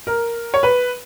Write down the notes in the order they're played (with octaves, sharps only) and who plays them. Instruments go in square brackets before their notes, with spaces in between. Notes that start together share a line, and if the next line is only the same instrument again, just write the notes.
[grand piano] A#4
C#5
B4